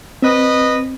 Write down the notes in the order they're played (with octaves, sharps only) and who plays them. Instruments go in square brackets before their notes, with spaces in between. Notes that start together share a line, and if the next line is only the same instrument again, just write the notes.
[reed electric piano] C4 [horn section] B4 D#5